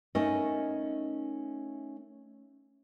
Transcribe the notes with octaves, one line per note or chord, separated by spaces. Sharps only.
A3 C#4 D#4 A#4 D#5